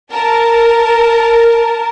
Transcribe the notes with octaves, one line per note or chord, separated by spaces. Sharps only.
A#4 A5